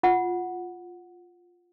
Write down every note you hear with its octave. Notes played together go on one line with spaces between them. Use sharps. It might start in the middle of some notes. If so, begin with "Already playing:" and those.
F4 F#5